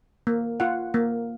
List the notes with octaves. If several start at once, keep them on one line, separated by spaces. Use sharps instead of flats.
A#3
F4 F#5
A#3